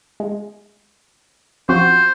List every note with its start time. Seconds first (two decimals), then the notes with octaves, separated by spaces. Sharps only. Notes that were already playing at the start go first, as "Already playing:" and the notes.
0.20 G#3
1.69 F3 C4 F#4 C5